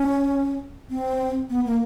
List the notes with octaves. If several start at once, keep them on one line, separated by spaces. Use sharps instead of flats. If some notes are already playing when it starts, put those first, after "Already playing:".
Already playing: C#4
C4
B3
A#3